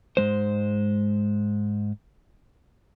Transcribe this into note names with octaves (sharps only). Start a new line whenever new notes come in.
G#2 G#3 C5